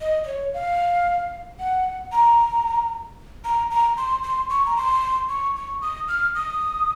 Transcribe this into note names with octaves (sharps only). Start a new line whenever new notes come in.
D#5
D#5
C#5
F5
F#5
A#5
A#5
A#5
C6
C6
C#6
A#5
C6
C#6
C#6
D#6
F6
D#6